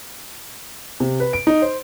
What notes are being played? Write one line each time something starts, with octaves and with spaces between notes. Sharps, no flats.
C3
B4
D7
D#4
C5